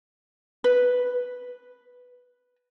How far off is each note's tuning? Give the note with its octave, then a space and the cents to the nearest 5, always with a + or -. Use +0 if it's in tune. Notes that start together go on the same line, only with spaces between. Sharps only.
B4 +0